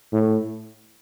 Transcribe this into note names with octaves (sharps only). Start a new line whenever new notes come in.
A2